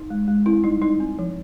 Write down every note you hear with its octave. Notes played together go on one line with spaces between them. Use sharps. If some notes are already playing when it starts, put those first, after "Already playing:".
Already playing: D#4
G#3
G#3
C4 E4
G3 D#4
G3 D#4
C4
F3